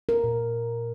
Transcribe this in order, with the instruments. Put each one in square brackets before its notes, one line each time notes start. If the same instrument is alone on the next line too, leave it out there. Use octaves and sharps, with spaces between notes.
[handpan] A#4
A#2